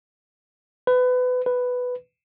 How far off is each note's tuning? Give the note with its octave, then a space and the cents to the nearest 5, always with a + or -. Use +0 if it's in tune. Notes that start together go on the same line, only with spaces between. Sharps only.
B4 +25
B4 +5